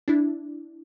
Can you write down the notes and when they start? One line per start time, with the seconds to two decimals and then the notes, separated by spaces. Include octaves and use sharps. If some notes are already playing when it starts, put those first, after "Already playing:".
0.08 D4 E4